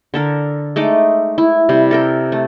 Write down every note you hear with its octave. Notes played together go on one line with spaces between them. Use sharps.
D3 A4 A#4
G#3 A3 D#4 D6
E4
C3 G3
A4 A#4 G5
A3